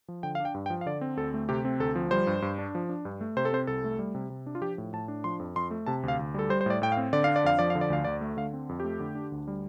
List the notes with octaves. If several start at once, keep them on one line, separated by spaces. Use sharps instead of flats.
F3
D3 G5
F5
D4
G5
G2
G5
F3
F5
D3 D5
C4
D2 A4
A3
C3 G4
C4
D2 A4
F3
G3 C5
G2
G2
D4
F3
D4
G2
A3
C3 C5
A4
C4 C5
C2 A4
A3
G3
C3
C3
D4
F4
F3 G4
A2
A2 A5
D4
F3 C6
F2
F2 C6
A3
C3 A5
D2
F5
D2
G3 A4
G3 C5
C5
A2 D5
A2 G5
F5
C4
D3 D5
D4 F5
D5
F2 F5
F3 D5
F5
D3
D5
D2 F5
D2 D5
A3
D3 F5
C4
F2
A3 G4
D3
D4
D2
G3